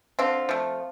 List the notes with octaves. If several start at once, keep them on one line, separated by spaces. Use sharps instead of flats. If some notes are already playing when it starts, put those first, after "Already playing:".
D3 C4 F4
F3 A3